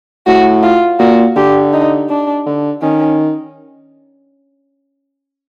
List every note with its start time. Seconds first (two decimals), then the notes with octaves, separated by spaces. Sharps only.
0.27 A2 F#4
0.63 F4
0.99 A#2 F#4
1.36 D3 G4
1.73 D#4
2.09 D4
2.46 D3
2.82 D#3 C#4